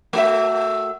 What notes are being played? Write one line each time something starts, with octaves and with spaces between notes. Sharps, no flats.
A3 F#4 E5